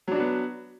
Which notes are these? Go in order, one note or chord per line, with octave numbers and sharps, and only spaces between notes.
F#3 B3 D4 F#4